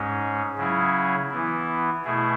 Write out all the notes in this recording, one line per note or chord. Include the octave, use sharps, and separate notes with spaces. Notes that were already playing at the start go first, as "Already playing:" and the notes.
Already playing: G#2 G#3 C#4
C#3 F#3 C#4 E4 G#4
E3 B3 E4
B2 A3 E4 G#4